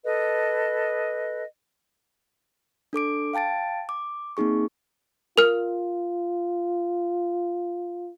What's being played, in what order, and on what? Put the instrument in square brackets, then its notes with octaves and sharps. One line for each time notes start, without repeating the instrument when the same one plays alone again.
[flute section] A4 B4 D#5
[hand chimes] D4 A4 D6 D7
F5 G5 A5 A6 D7
D6
A#3 C4 D#4 G#4 C#6
[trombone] F4 [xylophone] A#4 F6